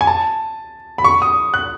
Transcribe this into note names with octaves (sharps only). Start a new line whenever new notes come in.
G#5
A5
B5
C#6
D#6
F#6